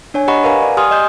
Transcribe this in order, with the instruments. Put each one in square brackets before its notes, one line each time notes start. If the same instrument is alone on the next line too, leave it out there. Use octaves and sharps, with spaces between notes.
[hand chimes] D4 C#5 G#5
G4 D#5 F#5 A#5 B5 C#6
A#4 B4 F5 F#5 G#5 A#5
D5
G4 G#5 C6 D#6 F6
D#5 C6 G6